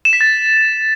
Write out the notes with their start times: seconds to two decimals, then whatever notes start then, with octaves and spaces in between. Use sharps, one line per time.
0.05 E7
0.13 B6
0.21 A6